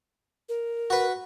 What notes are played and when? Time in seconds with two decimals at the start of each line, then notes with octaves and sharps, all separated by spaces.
0.49 A#4
0.90 F#4 B4